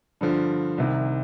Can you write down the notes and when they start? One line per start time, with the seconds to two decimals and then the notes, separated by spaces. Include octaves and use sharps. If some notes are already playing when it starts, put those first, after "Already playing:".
0.21 G2 D3 F3
0.78 C2 C3 D#3